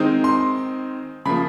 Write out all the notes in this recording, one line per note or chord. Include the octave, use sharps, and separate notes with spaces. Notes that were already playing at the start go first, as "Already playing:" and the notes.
Already playing: D#3 G#3 C4 D#4
C6
C#3 F3 A#3 B5